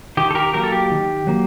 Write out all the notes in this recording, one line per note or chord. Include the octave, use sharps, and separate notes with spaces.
D#3 G4
A4
G4 A#4
F#3 A#3 G4 A#4
A4
G4
D#3
F#3 A#3